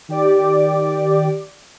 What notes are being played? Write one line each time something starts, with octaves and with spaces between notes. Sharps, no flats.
D#3 G4 D5 D6